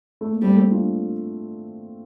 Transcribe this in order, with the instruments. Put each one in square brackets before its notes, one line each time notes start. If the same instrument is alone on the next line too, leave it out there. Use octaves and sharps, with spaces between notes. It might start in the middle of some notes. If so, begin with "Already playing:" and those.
[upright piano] A3
A#3
[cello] G3 [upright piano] A3 C4
[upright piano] A#3
A3 C4
D4 F4